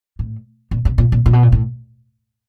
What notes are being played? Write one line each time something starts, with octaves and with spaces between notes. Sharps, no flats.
A2
A#2
C3
A#2
A#2
A#2
B2
A#2
A2